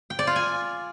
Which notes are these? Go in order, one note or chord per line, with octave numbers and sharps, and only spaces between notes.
G5
D5
F4
G#5